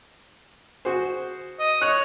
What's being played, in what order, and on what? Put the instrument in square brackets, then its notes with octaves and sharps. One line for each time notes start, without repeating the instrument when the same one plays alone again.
[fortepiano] F#4 G#4 C5
[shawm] D#5
[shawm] C#5 [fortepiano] F#6